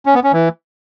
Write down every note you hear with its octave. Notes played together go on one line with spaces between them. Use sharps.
C#4
B3
C#4
E3